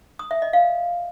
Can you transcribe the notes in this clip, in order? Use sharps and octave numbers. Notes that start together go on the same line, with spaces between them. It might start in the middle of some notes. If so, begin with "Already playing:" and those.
D#6
E5
D#5
F5